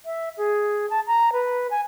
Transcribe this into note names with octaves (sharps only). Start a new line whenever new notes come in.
E5
G#4
A5
A#5
B4
G#5